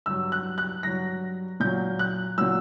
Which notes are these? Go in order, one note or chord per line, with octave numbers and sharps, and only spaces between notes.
G2 F#3 E6
F#6
F#6
G2 F#3 A#6
A#2 F#3 G6
F#6
A#2 F#3 E6